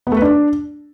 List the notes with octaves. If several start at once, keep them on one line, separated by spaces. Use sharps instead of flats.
B3
A3
B4
D4